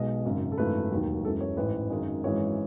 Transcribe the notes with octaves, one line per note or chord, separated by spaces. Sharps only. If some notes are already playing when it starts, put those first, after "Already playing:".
Already playing: B1 B2 G#3 D#5
G#1 F#2 C#3
A4
G#1 F#2 E3 A3 B4
E1 D#2 D#3 F#3
F#2 E3 G#3 A4
C#5
A1 G#2 E3 B4
G#1 F#2 D#3 G#3
G#1 F#2 E3 G#3 C#5